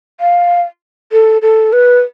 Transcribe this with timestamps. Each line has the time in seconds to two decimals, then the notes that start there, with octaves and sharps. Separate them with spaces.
0.20 F5
1.12 A4
1.42 A4
1.73 B4